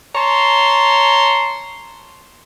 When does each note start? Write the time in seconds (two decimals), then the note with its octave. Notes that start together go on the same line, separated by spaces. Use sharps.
0.15 C#5 A5 A#5 C6